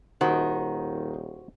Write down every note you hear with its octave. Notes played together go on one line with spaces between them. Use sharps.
D#1 D#3 F#4 C5 F#5